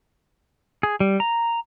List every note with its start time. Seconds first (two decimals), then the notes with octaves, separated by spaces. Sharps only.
0.83 G#4
1.00 G3
1.20 A#5